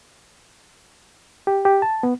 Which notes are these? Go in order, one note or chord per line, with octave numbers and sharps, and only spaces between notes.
G4
G4
A5
B3